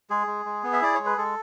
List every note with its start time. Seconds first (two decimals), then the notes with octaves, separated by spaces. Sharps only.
0.10 G#3 G#4
0.27 G#3
0.46 G#3
0.64 B3
0.73 E5
0.82 E4 D5
0.95 G#3 C#5
1.06 B4
1.18 G#3 A4